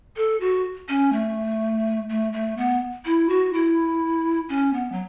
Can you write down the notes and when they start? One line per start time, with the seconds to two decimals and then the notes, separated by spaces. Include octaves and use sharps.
0.17 A4
0.40 F#4
0.89 C#4
1.13 A3
2.09 A3
2.33 A3
2.57 B3
3.05 E4
3.29 F#4
3.53 E4
4.49 C#4
4.74 B3
4.92 F#3